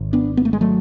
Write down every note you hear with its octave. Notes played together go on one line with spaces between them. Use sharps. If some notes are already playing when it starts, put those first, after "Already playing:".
Already playing: G#1
B3 D4
B3
A3
G#3
F#3 A3